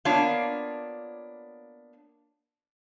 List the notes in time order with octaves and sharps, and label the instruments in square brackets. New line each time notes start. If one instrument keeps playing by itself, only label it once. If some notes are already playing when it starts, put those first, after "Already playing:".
[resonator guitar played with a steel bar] A#3 B3 D4 F4 C#5 F5